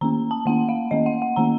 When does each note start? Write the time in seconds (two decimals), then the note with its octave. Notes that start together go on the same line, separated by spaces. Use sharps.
0.01 D#3 A#3 C#4 A#5
0.31 A5
0.46 D#3 A#3 C#4 F#5
0.69 F5
0.91 D#3 A#3 C#4 D#5
1.06 F#5
1.22 F#5
1.36 D#3 A#3 C#4 A#5